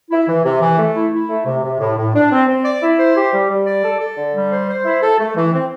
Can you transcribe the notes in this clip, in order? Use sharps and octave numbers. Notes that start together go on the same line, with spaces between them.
E4
E3
C3
E3
A3
E4
E4
A3
C3
C3
A2
A2
D4
C4
C4
D5
E4
C5
G4
G3
G3
D5
A4
A4
D3
G3
C5
C5
E4
A4
A3
E3
C4